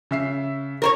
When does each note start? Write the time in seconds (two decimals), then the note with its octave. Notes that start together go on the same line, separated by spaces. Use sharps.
0.11 C#3 E5 C7
0.82 A#4 C5 C#5